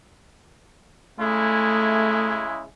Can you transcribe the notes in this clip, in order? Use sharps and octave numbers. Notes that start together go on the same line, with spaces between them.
C#3 G#3 A3 E4